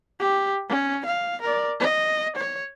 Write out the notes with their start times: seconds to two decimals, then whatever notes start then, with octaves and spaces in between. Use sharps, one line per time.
0.20 G4
0.69 C#4
1.05 F5
1.41 A#4 D5
1.80 D#5
2.36 C#5